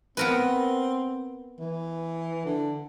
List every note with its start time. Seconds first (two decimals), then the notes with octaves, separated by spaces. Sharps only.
0.17 B3 C4 A#4 B4
1.60 E3
2.45 D3